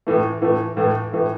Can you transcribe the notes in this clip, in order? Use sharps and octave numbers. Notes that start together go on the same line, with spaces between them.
A2 E3 A3
A2 E3 A3
A2 E3 A3
A2 E3 A3